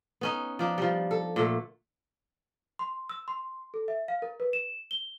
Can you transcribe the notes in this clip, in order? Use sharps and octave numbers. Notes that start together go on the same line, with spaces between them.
B3 C#4 D#4
F3 D4 D#4
F3 G3
A4
A#2 D3 A3
C6
E6
C6
A4
E5
F5
A#4
B4
E7
G7